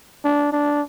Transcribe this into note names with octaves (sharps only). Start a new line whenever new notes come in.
D4
D4